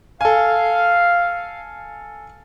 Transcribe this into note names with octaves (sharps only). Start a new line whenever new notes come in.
A4 F5 G#5